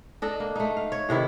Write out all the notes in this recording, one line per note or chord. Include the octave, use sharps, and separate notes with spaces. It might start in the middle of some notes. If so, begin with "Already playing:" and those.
D4 A4 D#5
A#3
A3 D#4
F5
C#5
A2 C3 D#3 E4